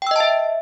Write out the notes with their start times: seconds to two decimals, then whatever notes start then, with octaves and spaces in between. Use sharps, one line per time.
0.02 G5
0.07 E6
0.11 D#5
0.16 A5
0.20 E5